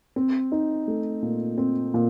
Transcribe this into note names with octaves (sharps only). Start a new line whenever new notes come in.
C4
D#4
A3
A#2
C4
A#2